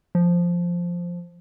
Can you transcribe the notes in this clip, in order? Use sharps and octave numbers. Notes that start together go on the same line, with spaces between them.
F3